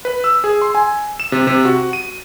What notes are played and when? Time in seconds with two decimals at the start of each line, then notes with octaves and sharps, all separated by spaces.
0.05 B4
0.24 E6
0.44 G#4
0.62 C6
0.75 G#5
1.20 E7
1.32 C3
1.47 C3
1.65 F#4
1.93 D#7